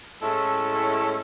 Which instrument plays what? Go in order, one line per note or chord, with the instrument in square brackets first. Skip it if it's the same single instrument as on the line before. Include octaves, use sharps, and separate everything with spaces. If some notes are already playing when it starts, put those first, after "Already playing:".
[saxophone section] A2 G#3 C#4 E4 A4